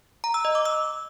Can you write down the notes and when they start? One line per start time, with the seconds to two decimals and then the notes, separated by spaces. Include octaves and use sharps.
0.24 A#5
0.34 E6
0.45 D#5
0.55 D6
0.65 E6